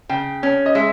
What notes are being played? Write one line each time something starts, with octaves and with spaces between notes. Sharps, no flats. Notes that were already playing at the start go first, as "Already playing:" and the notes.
C#3 G5
C#4
D#5
G#3 E5